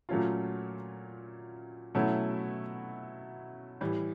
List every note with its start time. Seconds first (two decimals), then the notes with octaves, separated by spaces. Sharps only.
0.09 A#2 F#3 A3 C#4 F4
1.95 B2 F#3 A3 C#4 E4
3.81 A2 E3 G3